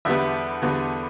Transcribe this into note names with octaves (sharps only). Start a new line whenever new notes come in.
E2 D3 G3 B3 E5
E2 D3 G3 B3